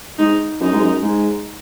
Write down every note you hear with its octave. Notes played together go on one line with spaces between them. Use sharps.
G#2 D#4
F#2 D#4
G#2
F#2
G#2